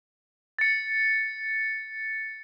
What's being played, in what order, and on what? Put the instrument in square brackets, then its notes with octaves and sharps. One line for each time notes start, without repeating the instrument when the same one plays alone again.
[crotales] A6 C#7